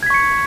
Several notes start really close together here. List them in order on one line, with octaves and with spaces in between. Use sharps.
G#6 B6 C#6 C#7